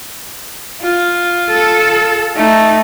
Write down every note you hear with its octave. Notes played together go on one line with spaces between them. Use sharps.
F4
A4
A3 D#4